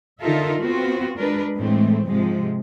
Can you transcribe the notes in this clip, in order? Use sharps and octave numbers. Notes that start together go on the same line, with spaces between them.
D3 D#4 F4 A4 A#4 E5
B3 C4 F4 F#4
G#3 D4 A#4 B4
A2 E3 G#3 A3 C4
G#2 C3 F3 G#3